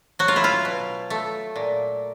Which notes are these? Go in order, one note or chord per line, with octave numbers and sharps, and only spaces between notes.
F#3 F#4
F4
E4
F4
B2
A3
A#2